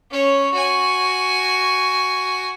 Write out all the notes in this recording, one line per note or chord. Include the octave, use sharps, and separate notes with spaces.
C#4 C#5
F#4 G#5